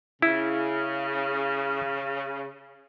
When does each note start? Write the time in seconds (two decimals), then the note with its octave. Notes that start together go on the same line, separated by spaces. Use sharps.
0.22 C#3 E4